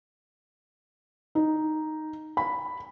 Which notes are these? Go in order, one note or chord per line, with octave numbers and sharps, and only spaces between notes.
D#4
B5